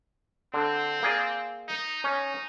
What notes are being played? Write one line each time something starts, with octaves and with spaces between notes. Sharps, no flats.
D3 C4
A#3 G#4 D5
D#4
C#4 D#4